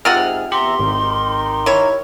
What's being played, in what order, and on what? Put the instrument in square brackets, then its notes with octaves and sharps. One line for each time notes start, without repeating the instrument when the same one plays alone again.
[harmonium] G#2 G#4 [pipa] C3 F4 F#5 [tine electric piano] F6
[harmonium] E2 E5 A#5 [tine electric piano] G4 [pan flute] C6
[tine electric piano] G#1 [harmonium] D#4 G4 A#4
[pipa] E4 C#5